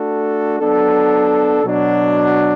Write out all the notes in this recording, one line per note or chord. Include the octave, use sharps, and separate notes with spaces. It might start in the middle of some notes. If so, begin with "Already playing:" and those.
Already playing: A3 D4 F#4 A4
F#3 B3 D4 A4
B2 F#3 D4